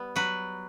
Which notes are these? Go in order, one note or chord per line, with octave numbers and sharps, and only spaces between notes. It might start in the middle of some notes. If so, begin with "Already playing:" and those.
Already playing: G3 B3
F#3 B4